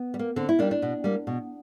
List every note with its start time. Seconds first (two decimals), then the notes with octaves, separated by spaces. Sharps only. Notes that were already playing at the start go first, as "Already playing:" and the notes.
Already playing: B3
0.14 G3
0.19 A#3
0.36 D3 C4
0.49 E4
0.59 G3 A#3 D4
0.71 D4
0.82 B2
1.04 G3 A#3
1.27 B2